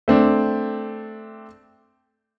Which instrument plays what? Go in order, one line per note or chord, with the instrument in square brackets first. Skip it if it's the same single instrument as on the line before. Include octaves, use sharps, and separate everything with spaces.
[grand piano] A3 C4 D4